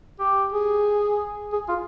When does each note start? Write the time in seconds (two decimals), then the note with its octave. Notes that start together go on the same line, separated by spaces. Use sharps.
0.19 G4
0.52 G#4
1.53 G#4
1.68 F4